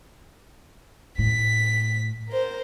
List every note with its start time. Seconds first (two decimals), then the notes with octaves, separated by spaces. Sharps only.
1.18 A2 B6
2.28 A#4 C5